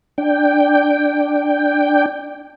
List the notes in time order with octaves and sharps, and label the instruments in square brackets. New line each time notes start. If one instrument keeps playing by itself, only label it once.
[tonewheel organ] D4 G5